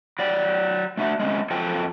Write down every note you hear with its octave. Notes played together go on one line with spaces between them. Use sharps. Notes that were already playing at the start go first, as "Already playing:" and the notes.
F#3 D5 G5
A3 D4 F#4 E5
G#3 C4 C#4
F2 F#3 A4 C5 G5 G#5